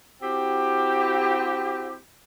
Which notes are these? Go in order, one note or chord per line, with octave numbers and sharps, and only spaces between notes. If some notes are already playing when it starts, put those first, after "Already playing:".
C4 E4 F#4 G4